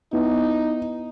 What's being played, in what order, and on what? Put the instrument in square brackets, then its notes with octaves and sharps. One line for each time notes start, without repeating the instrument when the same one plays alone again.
[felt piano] B3 E4 [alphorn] D#4